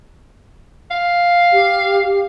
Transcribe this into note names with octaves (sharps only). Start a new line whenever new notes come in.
F5
G4